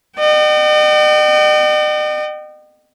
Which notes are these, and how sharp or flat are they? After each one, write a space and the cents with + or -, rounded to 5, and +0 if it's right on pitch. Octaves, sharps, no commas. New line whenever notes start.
D#5 -45 G5 -40